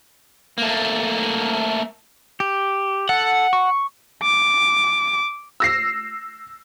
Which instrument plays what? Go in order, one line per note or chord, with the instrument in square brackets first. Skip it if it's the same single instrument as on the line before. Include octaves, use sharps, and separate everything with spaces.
[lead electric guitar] A3 A#3
[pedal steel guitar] G4
[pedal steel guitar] A4 [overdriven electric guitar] F#5
[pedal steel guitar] C#6
[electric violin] D6
[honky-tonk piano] E6 A#6 C7